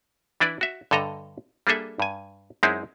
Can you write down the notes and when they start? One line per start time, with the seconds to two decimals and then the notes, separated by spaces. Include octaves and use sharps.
0.40 E3 D4 E4 B4 D5
0.61 F#4 E5
0.91 G2 D3 A4 D#5 A#5
1.67 G3 A#3 D4 G#4 A4 E5
2.00 G2 G#5
2.63 F#2 G#3 C4 D#4 E4 G#4